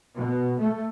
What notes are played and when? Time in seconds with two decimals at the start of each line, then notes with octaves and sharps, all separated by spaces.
0.16 B2
0.59 A3